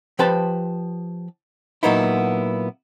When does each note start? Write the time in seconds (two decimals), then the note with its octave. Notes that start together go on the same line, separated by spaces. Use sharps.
0.19 F3 G4 B4 C5 A5
1.83 A#2 F#3 A#3 B3 D#4 E4